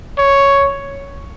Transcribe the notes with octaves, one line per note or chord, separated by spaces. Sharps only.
C#5